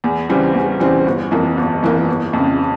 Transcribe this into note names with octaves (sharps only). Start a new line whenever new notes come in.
E2
C#3 E3 G3 C4
E2
C#3 E3 G3 C4
G1
F2 E3 A#3
G1
F2 E3 A#3
G1
F2 C#3